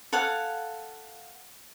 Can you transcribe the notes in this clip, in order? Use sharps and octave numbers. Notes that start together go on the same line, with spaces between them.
A4 F5 F#5 G#5